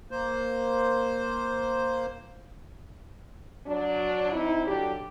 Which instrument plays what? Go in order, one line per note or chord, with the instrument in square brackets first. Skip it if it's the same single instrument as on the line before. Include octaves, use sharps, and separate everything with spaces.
[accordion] A#3 C5
[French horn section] F#3 D4
C4 D#4 E4
D3 F#3 D4 G4